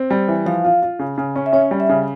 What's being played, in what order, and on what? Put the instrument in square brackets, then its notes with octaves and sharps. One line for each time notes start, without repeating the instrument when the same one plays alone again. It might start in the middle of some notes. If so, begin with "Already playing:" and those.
Already playing: [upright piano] C4
G3
E3
[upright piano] F3 [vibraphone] F5
[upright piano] F4
F4
C#3
C#3
C#4
[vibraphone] E5
[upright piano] C#4 [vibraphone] C#5
[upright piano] G3
[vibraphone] E5
[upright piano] C#3